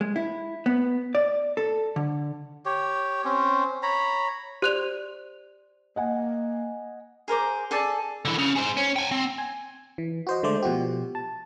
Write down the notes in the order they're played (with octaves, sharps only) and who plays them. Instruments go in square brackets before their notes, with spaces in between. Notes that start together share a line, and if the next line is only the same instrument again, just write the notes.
[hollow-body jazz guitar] G#3
E4
B3
D5
A4
D3
[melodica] G4 C#5
C4 C#4
C#5 A#5 B5
[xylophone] G4 F#6 F7 [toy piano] C5 D5
[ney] A#3 [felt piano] D#5 F#5 G#5
[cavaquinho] G#4 A#4 C5 D6
G#4 A4 D5 A5
[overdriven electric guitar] D3 E3
C#3
G#4 C5
C#4
G5 G#5
C4
[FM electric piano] G#5
E3
F#4 C5 D#5
D3 G#3 A3 C5 D5
B2 F3 F#4 G4
A5